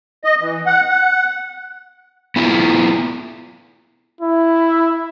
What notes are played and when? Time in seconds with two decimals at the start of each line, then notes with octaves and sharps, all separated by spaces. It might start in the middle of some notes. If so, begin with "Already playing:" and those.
0.24 D#5
0.41 E3
0.66 F#5
0.90 F#5
2.36 B3 E4 F4
4.21 E4